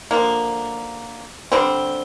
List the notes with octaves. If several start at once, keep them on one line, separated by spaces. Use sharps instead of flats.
D3 F3 A#3
D3 G3 C4